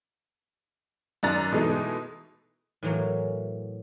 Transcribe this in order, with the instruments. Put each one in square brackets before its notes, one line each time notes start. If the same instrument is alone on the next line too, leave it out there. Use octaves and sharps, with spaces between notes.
[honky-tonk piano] F#2 D#3 D5 A#5 F#6 A6
B2 E3 G#3 A3 D#4
[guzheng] A2 E3 F#3 A#3